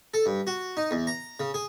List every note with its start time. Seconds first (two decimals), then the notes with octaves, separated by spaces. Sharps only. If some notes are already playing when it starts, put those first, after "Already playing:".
0.14 A4
0.26 G2
0.47 F#4
0.77 D#4
0.91 E2
1.07 A#5
1.40 C#3
1.54 G#4